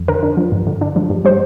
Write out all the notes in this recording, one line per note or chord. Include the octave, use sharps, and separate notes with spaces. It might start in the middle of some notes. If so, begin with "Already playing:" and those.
Already playing: F2
D3 A#4
D4
F3
G2
D3
D4
F3
G2
G3 C5